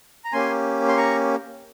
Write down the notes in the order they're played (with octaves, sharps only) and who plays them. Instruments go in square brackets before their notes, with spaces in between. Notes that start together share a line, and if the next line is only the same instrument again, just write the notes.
[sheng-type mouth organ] A#5
A#3 C#4 G4 G#5 C6
C6
A#5 C#6